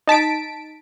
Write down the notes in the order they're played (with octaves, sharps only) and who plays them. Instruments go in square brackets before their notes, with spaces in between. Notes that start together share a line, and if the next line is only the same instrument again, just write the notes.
[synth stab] D#4 A5 B6 D7